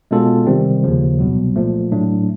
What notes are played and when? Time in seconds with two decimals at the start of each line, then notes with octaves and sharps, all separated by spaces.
0.11 B2 G#3 C#4 F4 A4
0.47 C3 D#3 G3 C4
0.84 D#2 C#3 F3
1.19 C2 B2 F#3
1.56 A#2 F3 A3
1.92 A2 F#3 A3 D4